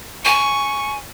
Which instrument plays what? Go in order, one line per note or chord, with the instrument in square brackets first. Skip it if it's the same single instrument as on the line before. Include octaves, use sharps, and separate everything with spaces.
[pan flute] G#5 [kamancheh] C#6